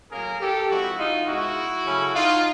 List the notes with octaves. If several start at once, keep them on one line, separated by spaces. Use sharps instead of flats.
A2 F#3 A#3 C#4 G#4 A#4
G4 A4
D3 F3 G#3 C4 E4 F#4
D#4 F4
B2 G#3 B3 E4 F#4
C#3 F#3 A3 C#4
D#4 F4